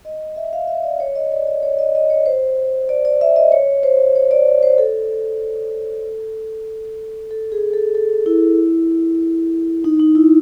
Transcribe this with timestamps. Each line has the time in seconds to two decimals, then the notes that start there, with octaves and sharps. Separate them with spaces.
0.05 D#5
0.36 E5
0.53 F5
0.68 E5
0.84 D5
1.00 C#5
1.15 D#5
1.32 D5
1.47 D5
1.63 C#5
1.79 D#5
1.95 D#5
2.10 C#5
2.26 C5
2.89 D5
3.05 D5
3.21 E5
3.36 D#5
3.52 C#5
3.83 C5
4.15 C#5
4.31 D5
4.63 C5
4.78 A4
7.31 A4
7.52 G#4
7.74 A4
7.95 A4
8.26 E4
9.84 D#4
9.99 D#4
10.15 E4